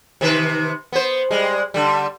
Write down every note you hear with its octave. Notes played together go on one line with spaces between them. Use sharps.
C3 D#3 B4
B3 C5
G3 G#3
D3 G3